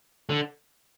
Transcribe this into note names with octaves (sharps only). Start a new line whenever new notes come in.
D3